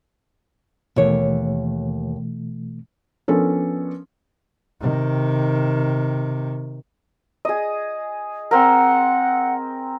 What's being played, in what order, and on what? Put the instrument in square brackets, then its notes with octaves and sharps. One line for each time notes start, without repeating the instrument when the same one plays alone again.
[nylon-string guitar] D#2 C#5 [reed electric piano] B2 E3 A3
[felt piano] F3 B3 C#4 D4 A4 A#4
[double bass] C3 D#3
[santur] G#4 D#5
[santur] C4 A#4 [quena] F#5